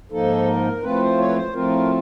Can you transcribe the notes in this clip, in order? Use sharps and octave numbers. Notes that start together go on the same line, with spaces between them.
G#2 F3 A#3 D#4 A4
A#4
A2 F3 A3 C4 F4 B4
C5
C#5
B4
C5
A2 F3 A3 C4 F4 A#4